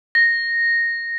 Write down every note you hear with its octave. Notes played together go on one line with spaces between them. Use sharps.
A#6